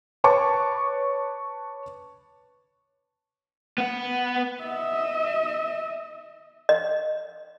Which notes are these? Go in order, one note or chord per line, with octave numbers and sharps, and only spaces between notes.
B4 C#5 A5 C#6 D6
B3 F#5
D#5 E5
D#5